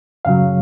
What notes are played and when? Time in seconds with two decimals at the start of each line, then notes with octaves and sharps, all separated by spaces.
0.25 F#2 C#3 F#3 F5